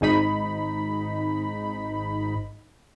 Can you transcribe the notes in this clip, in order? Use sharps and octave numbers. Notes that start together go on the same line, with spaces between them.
G#1 G#2 D#4 B5